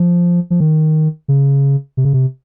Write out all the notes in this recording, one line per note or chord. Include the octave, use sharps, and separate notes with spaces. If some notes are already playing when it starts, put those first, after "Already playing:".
Already playing: F3
F3
D#3
C#3
C3
C#3
C3